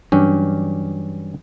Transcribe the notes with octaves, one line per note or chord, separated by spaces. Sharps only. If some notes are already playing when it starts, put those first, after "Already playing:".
G2 E3 F#3 C#4 D4 G4